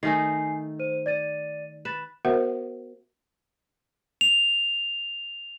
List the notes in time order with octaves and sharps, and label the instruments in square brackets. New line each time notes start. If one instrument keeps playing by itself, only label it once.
[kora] D#3 A3 D#4 [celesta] G#5 C7
[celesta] C5 D#7
D5 A6 D#7
[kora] B4 [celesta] A6 E7
[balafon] B3 F#4 A#4 C5 E5 F#5
[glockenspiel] F7